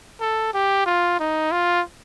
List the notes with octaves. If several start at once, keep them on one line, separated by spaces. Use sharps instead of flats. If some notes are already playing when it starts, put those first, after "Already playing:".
A4
G4
F4
D#4
F4